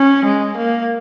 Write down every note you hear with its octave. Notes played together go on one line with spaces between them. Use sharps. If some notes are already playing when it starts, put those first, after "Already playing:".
Already playing: C#4
G#3
A#3